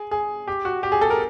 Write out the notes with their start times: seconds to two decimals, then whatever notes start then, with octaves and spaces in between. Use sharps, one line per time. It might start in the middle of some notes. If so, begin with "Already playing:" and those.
Already playing: G#4
0.11 G#4
0.48 G4
0.65 F#4
0.83 G4
0.92 G#4
1.01 A4
1.10 A#4